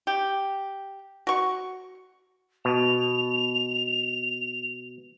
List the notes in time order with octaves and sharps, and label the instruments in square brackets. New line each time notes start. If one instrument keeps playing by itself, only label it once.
[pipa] G4
F#4 C#6
[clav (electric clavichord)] B2 [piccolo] F7